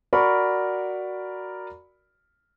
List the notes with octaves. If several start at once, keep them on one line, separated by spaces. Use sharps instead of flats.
F#4 A#4 D5 B5 C#6